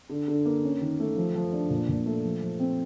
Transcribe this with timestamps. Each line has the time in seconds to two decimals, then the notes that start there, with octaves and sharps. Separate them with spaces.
0.09 D3
0.28 D3
0.45 A#3
0.64 C#4
0.81 D#3
1.00 A3
1.17 F3
1.35 F3
1.53 D4
1.70 A#2
1.88 A#2
2.06 A3
2.24 F3
2.42 F3
2.60 C4